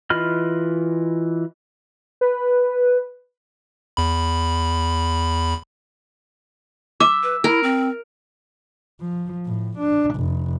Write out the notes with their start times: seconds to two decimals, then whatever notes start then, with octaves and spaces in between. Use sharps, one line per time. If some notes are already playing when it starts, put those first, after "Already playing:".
0.10 E3 F4 D#5 B5 F6
2.21 B4
3.97 E2 B5
7.00 E5 D6
7.23 B4
7.44 E4 A#4
7.63 C4
9.01 F3
9.46 A2
9.79 D4
10.16 F1